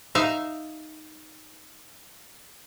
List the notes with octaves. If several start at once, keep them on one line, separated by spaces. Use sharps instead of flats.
D#4 E5 F5